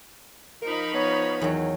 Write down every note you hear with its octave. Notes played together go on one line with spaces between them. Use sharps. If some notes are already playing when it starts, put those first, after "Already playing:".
F3 D#4 A#4 B5
B3 C#5
E2 D#3 F#3